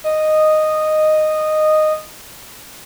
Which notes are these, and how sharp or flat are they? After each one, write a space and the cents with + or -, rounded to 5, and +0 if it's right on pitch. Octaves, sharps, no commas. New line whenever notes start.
D#5 -10